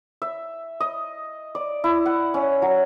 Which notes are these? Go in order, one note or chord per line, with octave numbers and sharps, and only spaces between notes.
E5
D#5
D5
E4
F#5
C#4
F#3